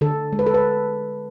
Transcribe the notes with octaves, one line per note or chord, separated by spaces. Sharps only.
D3 A4
G#3
B4
A4
B4